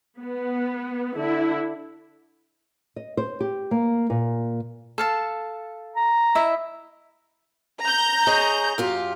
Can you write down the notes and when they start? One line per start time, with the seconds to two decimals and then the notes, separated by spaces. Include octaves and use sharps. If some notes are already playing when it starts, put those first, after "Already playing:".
0.20 B3
1.16 D3 E4
2.96 D#5
3.17 C5
3.40 G4
3.71 A#3
4.10 A#2
4.98 A4 F5 A5
5.96 A#5
6.35 E4 D#5 E5
7.82 A#5 G6
8.27 G#4 C#5 D#5
8.78 F#2 F4 G4